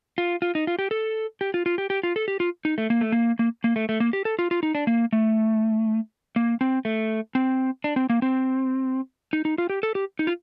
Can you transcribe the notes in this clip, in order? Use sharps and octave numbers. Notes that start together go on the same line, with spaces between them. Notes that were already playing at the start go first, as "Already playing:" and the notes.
F4
F4
D#4
F4
G4
A4
G4
F4
F4
G4
G4
F4
A4
G4
F4
D#4
A3
A#3
A3
A#3
A#3
A#3
A3
A3
A#3
G4
A4
F4
F4
D#4
D4
A#3
A3
A#3
C4
A3
C4
D4
C4
A#3
C4
D#4
D#4
F4
G4
A4
G4
D#4
F4